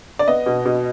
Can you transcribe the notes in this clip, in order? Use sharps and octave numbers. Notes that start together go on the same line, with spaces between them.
D5
B3 D#5
B2
B2